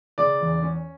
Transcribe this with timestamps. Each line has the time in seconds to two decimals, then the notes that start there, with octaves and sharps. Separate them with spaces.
0.18 C#3 D5
0.41 E2
0.62 C#4